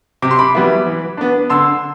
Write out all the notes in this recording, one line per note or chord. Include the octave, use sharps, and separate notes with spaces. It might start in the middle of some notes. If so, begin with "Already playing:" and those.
C3 D6
C6
B5 D6
E3 G3 B3 E4
E3
B3 D4
D3 C6 E6